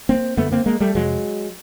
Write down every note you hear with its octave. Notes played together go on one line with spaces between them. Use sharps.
A#3 C4
F#2 D3 A3 B3
A#3 C4
G#3 A#3
G3 A3
F2 C3 F#3 G#3